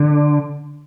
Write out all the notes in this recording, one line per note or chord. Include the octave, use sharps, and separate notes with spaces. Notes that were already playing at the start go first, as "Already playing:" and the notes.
Already playing: D3